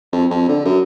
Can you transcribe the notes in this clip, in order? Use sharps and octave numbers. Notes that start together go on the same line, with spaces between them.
F2
F2
D3
F#2